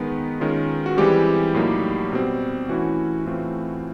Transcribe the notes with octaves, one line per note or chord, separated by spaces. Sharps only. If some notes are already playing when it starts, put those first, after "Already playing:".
Already playing: D#3 G#3 B3 D#4 B4
D#3 G#3 C#4 F4
F#4
E3 G3 G#3 C4 G4
A2 F#3 A#3 D#4
B2 G3 C4
E3 A3 C#4 E4 F#4
A2 E3 A3 C4 F4